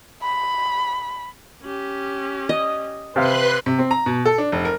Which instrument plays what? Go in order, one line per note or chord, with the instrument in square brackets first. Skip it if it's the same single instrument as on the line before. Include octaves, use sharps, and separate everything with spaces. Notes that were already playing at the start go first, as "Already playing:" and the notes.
[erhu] B5
[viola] C#4 G4
[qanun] D#5
[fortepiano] C3 F5 [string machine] B4 C6 F#6 [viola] C5
[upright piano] C3
C4
A#5
B2
A4
D4
F1
A#4